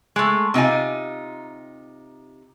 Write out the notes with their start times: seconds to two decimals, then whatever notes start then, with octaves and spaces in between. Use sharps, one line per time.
0.16 G#3 A3
0.54 C3 D#4 F4 G#5